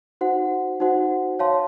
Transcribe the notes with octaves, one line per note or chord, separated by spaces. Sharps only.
D#4 F#4 C5 F#5
D#4 F#4 C5 F#5
C#5 F5 A5 C6